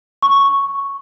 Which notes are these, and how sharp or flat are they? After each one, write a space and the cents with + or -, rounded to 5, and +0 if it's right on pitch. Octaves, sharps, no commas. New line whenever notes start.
C#6 +0